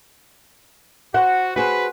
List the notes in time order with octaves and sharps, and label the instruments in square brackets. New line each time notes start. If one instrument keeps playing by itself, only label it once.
[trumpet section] F#4 [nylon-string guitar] C5 F#5
[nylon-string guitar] F#4 G#4 C5 [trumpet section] B4